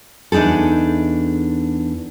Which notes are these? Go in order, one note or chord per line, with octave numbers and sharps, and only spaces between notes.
E2 D4 D#4 G#4 A4